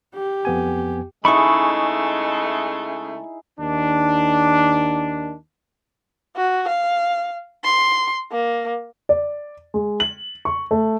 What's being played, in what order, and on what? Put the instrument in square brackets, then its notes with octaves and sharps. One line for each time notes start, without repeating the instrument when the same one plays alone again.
[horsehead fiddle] G4
[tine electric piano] F2 B3 G#5
[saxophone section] C#3 G#3 A3 [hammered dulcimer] D#4 E4 G#4 [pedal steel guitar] B5 C#6
[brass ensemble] D#2 D#3 D4
[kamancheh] F#4
F5
C6
A#3
[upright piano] D5
G#3
F#7
C#6
A3